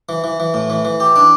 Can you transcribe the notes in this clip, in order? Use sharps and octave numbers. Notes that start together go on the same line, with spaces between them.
E3
E3
E3
A2
E3
E3
G4
D4